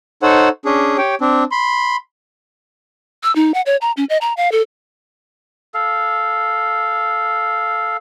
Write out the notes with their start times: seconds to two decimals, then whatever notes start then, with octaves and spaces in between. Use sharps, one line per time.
0.23 D#4 A4 C5 C#5 F#5
0.65 C#4 D4 G#4
0.98 G4 C#5 G5
1.21 C4 D4
1.51 B5 C6
3.24 E6
3.36 D#4
3.54 F#5
3.66 C#5
3.81 A#5
3.97 C#4
4.09 D#5
4.21 A#5
4.37 F5
4.52 A4
5.74 A4 F5